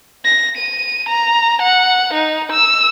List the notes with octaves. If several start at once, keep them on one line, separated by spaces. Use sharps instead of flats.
A#6
D#7
A#5
F#5
D#4
E6